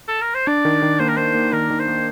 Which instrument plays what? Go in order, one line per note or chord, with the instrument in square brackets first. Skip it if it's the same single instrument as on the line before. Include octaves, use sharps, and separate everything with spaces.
[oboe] A4
A#4
C5
[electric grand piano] D4 [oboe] D5
[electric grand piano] D#3
D#3
[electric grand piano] A#3 [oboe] C5
[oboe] A#4
[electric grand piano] A#3 [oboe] C5
[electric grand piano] A#3
[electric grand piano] D#3 [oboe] A#4
[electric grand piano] D#3
[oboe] C5
[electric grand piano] A#3